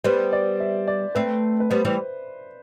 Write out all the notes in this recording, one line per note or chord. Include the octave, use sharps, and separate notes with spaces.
G3 B3 C5
D5
E5
D5
A3 C4 B4
B4
G3 B3 C5
E3 G3